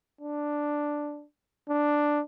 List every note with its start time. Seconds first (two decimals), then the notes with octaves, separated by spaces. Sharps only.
0.21 D4
1.69 D4